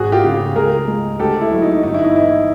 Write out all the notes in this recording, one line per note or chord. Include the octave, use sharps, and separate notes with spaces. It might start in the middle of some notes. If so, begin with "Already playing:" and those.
Already playing: G#1 F#4 G#4
F4 G4
C#3
C#2 G#4 A#4
G#3
D2 G4 A4
E4
F#3
D#4
G1 D#4
E4
D#4
E3 E4